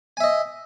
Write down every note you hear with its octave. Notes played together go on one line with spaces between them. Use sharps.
D#5 E5 G#5